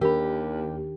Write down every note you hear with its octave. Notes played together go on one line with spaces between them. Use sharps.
D#2 D#3 D4 G4 A#4 B5